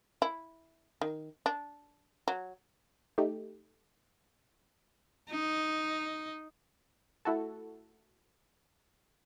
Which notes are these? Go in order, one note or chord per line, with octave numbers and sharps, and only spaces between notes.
E4
D#3
D4
F#3
A3 D#4 G4
D#4
A3 E4 F#4 A4